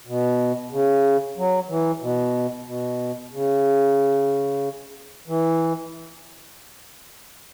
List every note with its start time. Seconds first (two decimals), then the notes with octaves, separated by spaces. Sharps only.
0.07 B2
0.71 C#3
1.37 F#3
1.69 E3
2.01 B2
2.66 B2
3.32 C#3
5.27 E3